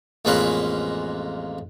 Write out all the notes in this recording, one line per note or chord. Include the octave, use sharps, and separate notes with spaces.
A1 F2 G#3 A#3 C#4 B4